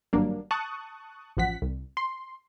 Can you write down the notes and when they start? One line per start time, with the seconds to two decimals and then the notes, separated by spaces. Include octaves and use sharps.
0.13 G#1 G2 F#3 A#3 D4
0.51 A5 C#6 D#6 F#6
1.37 A1 F#2 F3 F#5 B6
1.62 C2
1.97 C6